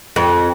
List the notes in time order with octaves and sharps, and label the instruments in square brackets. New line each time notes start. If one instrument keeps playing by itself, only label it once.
[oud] F2